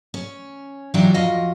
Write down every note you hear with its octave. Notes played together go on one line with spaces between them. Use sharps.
C#4
E3 F#3 D4 D#4 F4 G4
F2 F3 F#4 D#5 F5